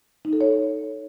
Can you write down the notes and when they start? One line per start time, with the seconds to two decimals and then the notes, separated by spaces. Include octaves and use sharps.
0.25 D#4
0.33 A4
0.41 C#5